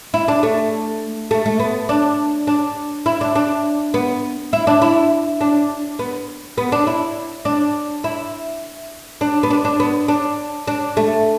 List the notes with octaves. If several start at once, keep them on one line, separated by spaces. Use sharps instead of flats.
E4
D4
A3
A3
A3
B3
D4
D4
E4
D4
D4
B3
E4
D4
E4
D4
B3
B3
D4
E4
D4
E4
D4
B3
D4
D4
B3
D4
D4
A3